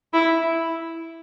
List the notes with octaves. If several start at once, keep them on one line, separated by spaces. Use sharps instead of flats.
E4